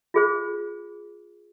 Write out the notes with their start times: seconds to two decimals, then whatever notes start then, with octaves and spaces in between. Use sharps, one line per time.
0.14 F4 G#4 C5